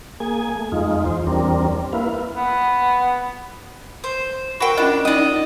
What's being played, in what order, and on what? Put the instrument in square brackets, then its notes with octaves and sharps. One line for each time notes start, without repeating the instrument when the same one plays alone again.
[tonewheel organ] A#3 G#4 G#5
A3
F2 G#3 D#4 F4
E2 C5
E2 G3 C4 D4 A#4
A#3 E4 B4 F5
[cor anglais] B3
[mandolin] C5
[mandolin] F#4 G5 [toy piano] A#4 F#5 B5
[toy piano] C#4 F4 D#5 [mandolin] D4
[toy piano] C#4 D#4 [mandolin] D5 D#5